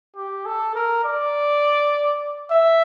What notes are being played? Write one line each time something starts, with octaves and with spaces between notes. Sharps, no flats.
G4
A4
A#4
D5
E5